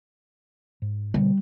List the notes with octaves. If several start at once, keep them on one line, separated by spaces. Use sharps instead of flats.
G#2
B2 D3 G3 A#3